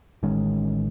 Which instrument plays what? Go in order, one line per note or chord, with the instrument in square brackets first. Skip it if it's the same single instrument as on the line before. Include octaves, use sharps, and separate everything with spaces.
[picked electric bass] A1 D#3 G#3 C#4